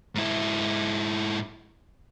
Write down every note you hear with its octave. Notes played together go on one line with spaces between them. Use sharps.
G#2 E4